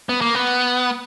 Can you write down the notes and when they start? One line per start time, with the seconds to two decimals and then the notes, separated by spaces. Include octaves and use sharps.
0.09 B3
0.21 A#3
0.35 B3